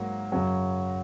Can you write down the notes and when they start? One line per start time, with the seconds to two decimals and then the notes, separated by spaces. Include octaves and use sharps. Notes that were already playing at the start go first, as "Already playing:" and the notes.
Already playing: G#2 F#3 A#3
0.32 F#2 C#3 F#3